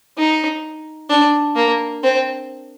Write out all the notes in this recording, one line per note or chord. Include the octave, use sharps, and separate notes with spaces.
D#4
D4
A#3
C4